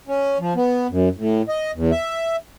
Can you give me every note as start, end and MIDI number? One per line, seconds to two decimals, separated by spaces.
0.08 0.38 61
0.39 0.53 53
0.56 0.87 59
0.90 1.09 42
1.17 1.42 45
1.49 1.71 75
1.75 1.91 40
1.92 2.36 76